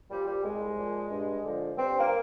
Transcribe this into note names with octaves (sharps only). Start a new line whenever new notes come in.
A#2 F3 G3
G3
C2 G#3
A#2 F3
G2
D3 F3
G2 C4
A#3